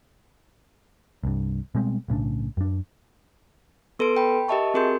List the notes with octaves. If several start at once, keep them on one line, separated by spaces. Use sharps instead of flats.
C2 G2
B2 G3 G#3 C4
B1 A2 C#3 D4
F#2 D4
B3 A4 B4 C6 D7
G5 B5
G4 A#4 D#5 E5 A5 C#6
C4 F#4 G#4 A#4 C6 G6